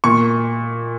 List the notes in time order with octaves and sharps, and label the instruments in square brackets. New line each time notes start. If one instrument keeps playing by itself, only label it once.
[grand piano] A#2 C#6